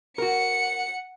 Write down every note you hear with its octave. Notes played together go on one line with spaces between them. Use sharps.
F#4 A#4 F#5 C#7